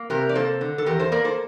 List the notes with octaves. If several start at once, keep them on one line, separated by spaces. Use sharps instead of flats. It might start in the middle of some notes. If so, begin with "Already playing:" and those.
Already playing: A#3
C3 G4 A#4
D5
A#3 A4 C5
D3
A4
E2 G4 A#4
A4 C5
A#3 A#4 D5
A4 C5